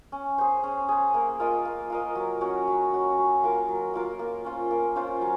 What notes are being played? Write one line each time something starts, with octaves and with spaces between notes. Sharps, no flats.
C#4
G#4 C5
C#4
G#4 C5
A#3
F4 A#4 D#5
A#3
F4 A#4 D#5
F#3
C#4 F#4 C#5
F#3
C#4 F#4 C#5
F#3
A#3 F4 A#4
F#3
A#3 F4 A#4
A#3
C#4 F4 C5
A#3
C#4 F4 C5
F#3